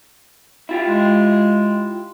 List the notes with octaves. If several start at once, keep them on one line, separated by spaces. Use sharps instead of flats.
E4 F4 G4
G#3